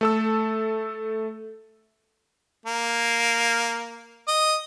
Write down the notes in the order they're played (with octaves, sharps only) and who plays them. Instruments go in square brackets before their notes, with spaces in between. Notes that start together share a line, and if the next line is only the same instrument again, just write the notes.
[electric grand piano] A3 A4 E6
[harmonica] A#3
D#5